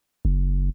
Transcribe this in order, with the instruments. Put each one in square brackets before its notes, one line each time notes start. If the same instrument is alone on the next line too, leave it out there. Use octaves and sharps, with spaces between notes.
[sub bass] F#1